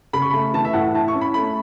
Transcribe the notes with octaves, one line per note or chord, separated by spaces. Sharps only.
C#3 B5
C#6
A3 B5
E3 A5
E5
A2 F#5
E4 A5
C#6
C#4
B5
A3 B5